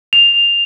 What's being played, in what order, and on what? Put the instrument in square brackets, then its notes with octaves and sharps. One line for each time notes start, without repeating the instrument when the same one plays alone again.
[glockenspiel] F7